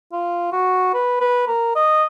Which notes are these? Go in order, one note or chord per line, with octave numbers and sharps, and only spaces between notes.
F4
F#4
B4
B4
A#4
D#5